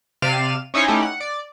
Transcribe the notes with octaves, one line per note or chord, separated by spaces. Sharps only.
C3 D5 F5 F6 D#7 E7
C#4 D#4 E4 C5 C#5 G#5
A3 C#4 D#4 E4 G4
F#5
D5